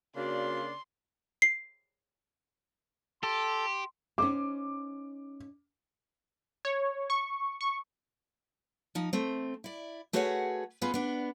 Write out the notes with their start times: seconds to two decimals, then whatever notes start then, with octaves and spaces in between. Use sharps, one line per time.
0.16 C#3 A#3 D4 F#4 D5 C6
1.42 C7
3.23 G4 A4 C6
4.18 C#4 D#4 C5 D6
6.65 C#5
7.10 C#6
7.61 C#6
8.95 F3 D#4
9.13 A3 C4
9.64 E4 D5
10.13 A3 F#4 G#4 B4 C#5 F#5
10.81 B3 F4 G#4 B4
10.94 B3 D4